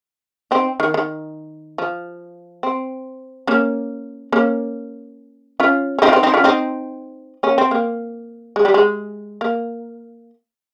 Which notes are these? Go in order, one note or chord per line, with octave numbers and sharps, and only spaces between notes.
C4 D#4
D#3
D#3
F3
C4
A#3 C#4
A#3 C#4
C#4 F4
C#4
C4 D#4
F4
C4 D#4
C4 D#4
C#4 F4
C4 D#4
A#3 C#4
C4
A#3
G#3
G3
G#3
A#3